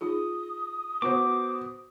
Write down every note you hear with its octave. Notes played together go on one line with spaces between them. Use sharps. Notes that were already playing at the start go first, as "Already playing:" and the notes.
D#4 F4 G#4 D#6
B3 F#4 C5 C#6 D6